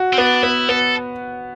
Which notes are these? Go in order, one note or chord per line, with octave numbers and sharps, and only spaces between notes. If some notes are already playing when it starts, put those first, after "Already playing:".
Already playing: F#4
C4
B3 D4
B3 E4
B3 A4